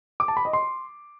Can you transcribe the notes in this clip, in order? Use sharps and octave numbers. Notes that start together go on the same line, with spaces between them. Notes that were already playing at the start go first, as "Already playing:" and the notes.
D6
A5
B5
D#5
C6